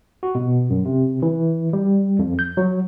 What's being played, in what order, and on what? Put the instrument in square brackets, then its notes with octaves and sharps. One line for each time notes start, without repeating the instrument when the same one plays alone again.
[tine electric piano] F#4
B2
F#2
C3
E3
G3
F2
G6
F#3